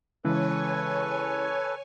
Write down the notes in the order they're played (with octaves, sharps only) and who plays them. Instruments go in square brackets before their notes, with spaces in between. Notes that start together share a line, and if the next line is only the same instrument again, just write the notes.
[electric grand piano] C#3 E3 G#3 [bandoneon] A4 B4 [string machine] C#5 G#5